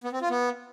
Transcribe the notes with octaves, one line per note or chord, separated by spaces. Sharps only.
B3
C4
F4
B3